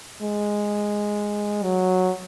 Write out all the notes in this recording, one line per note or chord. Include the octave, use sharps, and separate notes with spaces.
G#3
F#3